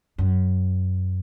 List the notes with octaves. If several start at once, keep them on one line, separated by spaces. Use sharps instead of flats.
F#2